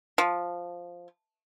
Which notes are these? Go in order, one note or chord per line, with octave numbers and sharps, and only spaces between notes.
F3